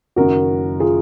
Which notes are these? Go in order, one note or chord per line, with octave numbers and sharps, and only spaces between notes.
F#1 F#2 D#3 F#4 A#4
F4 G#4